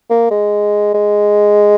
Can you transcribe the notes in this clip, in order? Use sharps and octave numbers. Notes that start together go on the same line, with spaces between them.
A#3
G#3
G#3